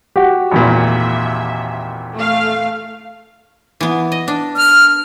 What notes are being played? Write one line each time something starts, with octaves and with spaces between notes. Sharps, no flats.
F#4 G4
G#1 E2 A#2 E5
A3 F5
E3 B3
D#5
D4
F6